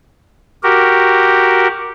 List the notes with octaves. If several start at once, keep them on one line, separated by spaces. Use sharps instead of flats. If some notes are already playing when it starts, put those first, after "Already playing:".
F#4 G4 A#4